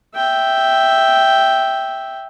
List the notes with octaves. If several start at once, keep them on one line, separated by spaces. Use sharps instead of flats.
E5 G5